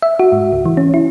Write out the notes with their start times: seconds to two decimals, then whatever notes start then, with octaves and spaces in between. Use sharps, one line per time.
0.02 E5
0.19 F#4
0.32 G#2
0.53 C#2
0.66 E3
0.77 C#4
0.94 E4